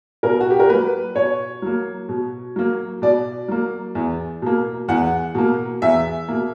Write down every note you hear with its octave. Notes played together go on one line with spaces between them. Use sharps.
B2 A#4
F#4
G4
A#4
F#3 A#3 B4
B2 C#5
F#3 A#3
B2
F#3 A#3
B2 D5
F#3 A#3
E2
B2 A#3
E2 F#5
B2 A#3
E2 E5
B2 A#3